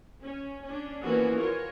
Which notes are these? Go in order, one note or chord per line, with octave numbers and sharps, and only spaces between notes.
C#4
C#4 D4
E3 F3 A#3 B3 C#4 F#4
F4 F#4 A#4 C#5